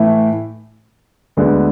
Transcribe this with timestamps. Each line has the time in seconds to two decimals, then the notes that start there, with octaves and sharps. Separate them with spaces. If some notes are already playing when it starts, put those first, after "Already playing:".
Already playing: A2 E3 A3 E4
1.37 D2 D3 G#3 B3